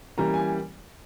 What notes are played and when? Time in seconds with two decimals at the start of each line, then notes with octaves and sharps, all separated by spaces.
0.17 E3 G3 A#3 C#4 A#5
0.34 G#5